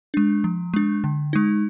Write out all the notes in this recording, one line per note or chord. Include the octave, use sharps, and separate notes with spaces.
G#3 D4
F3
G#3 D4
D3
G#3 D#4